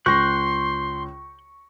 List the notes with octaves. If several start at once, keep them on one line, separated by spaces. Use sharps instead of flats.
C#2 C6 C#6 F#6 G6 A#6